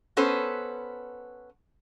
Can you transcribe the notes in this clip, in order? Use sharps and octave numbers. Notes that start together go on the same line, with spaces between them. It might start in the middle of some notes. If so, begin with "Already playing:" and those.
B3 C#4 A4 B4 C5